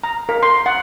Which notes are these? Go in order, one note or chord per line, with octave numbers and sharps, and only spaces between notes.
A#5
A#4
C6
F#5